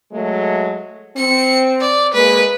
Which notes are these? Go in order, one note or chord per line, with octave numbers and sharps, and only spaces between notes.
F#3 G#3 A3
C4 C#7
D5
G#3 A#3 B4